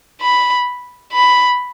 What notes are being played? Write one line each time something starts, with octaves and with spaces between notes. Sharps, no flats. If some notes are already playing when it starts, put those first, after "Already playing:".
B5
B5